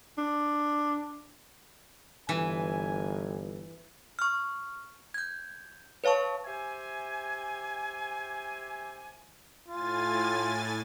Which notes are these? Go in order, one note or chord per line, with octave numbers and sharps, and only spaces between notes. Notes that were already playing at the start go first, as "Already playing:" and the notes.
D4
G1 E3 G#5
C#6 F6
G6 G#6
B4 C#5 F5 A5 C#6
G4 C5 E5 G#5
A2 F4 G#5 A6